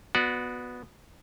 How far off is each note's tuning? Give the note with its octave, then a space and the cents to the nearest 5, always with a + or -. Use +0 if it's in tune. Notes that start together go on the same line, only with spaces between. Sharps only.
B3 +0 F#4 -20 D5 +0